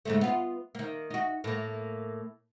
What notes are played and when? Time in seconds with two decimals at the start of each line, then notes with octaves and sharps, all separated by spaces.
0.05 G#2 C#3 A3
0.21 B3 F4
0.75 D#3 A#3
1.10 D#4 F#4
1.44 A2 A#3